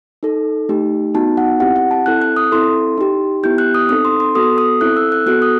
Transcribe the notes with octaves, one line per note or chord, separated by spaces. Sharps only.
D#4 A4
A3 D#4 G4
B3 D#4 F#4 A5
F#5
C4 E4 G4 F#5
F#5
A5
C4 E4 A4 F#6
F#6
D#6
C4 E4 A4 C6
D#4 G4
B3 E4 G4 G6
F#6
D#6
C4 D#4 A4 D#6
C6
C6
B3 F#4 A4 D#6
D#6
C4 E4 A4 F#6
E6
F#6
B3 F#4 A4 F#6
D#6